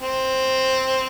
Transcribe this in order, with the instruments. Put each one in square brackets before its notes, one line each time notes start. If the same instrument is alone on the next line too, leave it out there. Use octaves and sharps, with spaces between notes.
[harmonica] C4